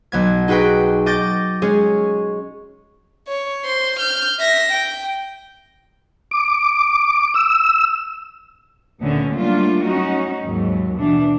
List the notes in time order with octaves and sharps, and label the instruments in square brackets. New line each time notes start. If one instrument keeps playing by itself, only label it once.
[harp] B1 B3 G#6
D#4 F#4 G#4 B4 G5
D#5 D6 G6 A6 A#6
G#3 C#4 G#4
[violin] C#5
C5 C6
F6 G6
E5 A#6
G5
[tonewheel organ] D6
E6
[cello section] D2 A#2 D3 A3 B3 C#4
F#3 G3 A3 A#3 D4 F4
C#4 D#4 F#4
D#2 G#2 F#3
B2 E3 D4